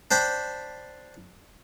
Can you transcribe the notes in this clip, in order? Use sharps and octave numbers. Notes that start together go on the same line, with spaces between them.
D4 C5 G5 B5